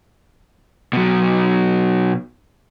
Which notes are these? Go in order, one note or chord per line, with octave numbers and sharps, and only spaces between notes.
B2 F#3